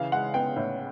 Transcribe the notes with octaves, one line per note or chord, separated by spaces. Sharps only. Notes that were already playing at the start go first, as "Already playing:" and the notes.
Already playing: C#3 E3 F5
G#3 F#5
B3 G5
A2